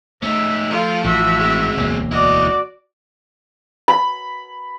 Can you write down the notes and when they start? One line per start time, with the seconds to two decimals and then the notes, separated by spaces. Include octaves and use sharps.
0.23 A3 C#4 D#4 E5
0.71 F3 F4 A4
1.04 A1 F#4 E5
1.40 G#3 C4
1.77 E1 D2 A#3
2.11 E4 F#4 D5 D#5
3.88 B5